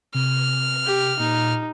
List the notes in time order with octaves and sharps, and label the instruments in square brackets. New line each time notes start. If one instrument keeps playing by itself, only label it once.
[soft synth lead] C3 [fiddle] F6
[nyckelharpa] G4
[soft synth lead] A#2 [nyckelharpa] D#4